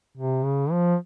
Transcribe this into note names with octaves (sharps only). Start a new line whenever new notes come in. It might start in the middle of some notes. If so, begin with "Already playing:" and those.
C3
C#3
F3